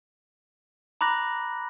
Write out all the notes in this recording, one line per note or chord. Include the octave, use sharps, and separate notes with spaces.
A#5 B5 D6 F#6 A#6